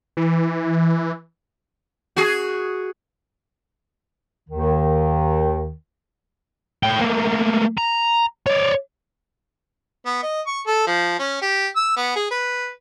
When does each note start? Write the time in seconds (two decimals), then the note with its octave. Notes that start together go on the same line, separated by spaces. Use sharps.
0.17 E3
2.16 F#4 G#4
4.49 D#2 D#3
6.83 A2 G5
7.01 A3 A#3
7.78 A#5
8.46 C#5 D5
10.06 B3
10.23 D#5
10.47 C#6
10.66 A4
10.87 F3
11.19 C#4
11.42 G4
11.76 E6
11.97 B3
12.16 G#4
12.31 B4